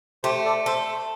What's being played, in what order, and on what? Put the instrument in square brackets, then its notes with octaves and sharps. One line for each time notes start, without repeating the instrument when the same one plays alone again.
[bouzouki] A3 [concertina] G4 C5
[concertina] A4 D5
[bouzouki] A4 [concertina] C5 E5